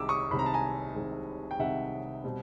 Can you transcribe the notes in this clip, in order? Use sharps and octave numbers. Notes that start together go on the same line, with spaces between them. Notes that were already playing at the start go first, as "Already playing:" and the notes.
Already playing: C2 C3 D#3 G#3 D6 E6
C#6 D#6
C2 C3 D#3 G#3 B5
A#5
A5
G#5 A#5
C2 C3 D#3 G#3
G5
C2 C3 D#3 G#3 E5 F#5
B2 G3 C4